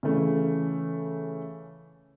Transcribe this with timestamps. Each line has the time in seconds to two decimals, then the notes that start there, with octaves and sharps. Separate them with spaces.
0.03 C#3 E3 A3